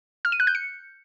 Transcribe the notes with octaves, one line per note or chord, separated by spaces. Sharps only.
F6
D#7
F#6
G6
C#7